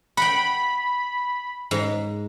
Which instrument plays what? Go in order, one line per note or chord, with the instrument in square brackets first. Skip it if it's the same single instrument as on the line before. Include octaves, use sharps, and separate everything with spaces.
[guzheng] F#5 G5 [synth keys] B5
[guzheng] G#2